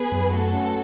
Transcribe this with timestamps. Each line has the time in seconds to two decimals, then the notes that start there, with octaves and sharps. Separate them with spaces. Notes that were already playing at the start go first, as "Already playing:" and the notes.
Already playing: B3 G#4 B4
0.12 F#2
0.32 A3 F#4 A4
0.53 C#4